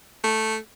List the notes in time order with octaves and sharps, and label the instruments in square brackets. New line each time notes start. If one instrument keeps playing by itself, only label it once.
[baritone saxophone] A3